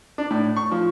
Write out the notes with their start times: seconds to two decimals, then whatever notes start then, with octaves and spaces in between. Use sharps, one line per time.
0.18 D4
0.30 A2
0.56 C#6
0.71 F3